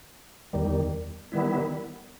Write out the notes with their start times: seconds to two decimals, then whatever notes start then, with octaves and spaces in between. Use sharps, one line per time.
0.53 E2 D#3 G3
1.32 D#3 G3 B3 E4